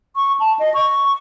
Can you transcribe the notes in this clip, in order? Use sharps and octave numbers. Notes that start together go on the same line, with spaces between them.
C#6
A5
D#5
C#6